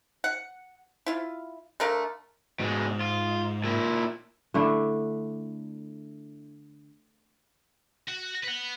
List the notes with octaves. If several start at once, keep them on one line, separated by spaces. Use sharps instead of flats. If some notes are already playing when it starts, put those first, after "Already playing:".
F#5
E4 F4
D3 A3 A#4 F5
G#2 B2 G#3
F4
A#2 E4
D3 A3 D4 E4
F#4
B4 F#5